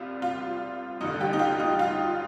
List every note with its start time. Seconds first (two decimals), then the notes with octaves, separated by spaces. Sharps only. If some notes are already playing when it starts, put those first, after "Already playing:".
Already playing: C2 C3 G3 F4
0.22 F4
1.01 A1 G2 D3 D#4
1.21 G4
1.33 D#4
1.39 F4
1.60 D#4
1.79 F4